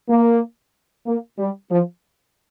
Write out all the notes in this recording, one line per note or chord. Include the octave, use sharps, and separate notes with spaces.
A#3
A#3
G3
F3